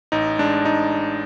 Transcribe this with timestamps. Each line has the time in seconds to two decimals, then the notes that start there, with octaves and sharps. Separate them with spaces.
0.12 A1 D#4
0.39 G#3 D4
0.65 D#4